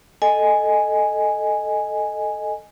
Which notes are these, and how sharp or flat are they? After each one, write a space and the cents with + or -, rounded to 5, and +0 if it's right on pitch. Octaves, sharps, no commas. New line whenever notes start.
A4 +0 D#5 -5 G#5 +0